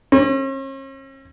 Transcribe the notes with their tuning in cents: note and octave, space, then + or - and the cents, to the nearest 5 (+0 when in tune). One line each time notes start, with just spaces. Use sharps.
C#4 -45